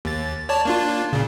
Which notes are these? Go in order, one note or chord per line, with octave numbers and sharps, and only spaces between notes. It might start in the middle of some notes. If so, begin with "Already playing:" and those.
D#2 A6
C#5 D5 A5
A#3 D4 F4
A#2 C#3